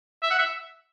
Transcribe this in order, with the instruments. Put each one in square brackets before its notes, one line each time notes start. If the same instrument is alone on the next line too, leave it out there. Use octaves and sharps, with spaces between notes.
[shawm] E5
F#5
E5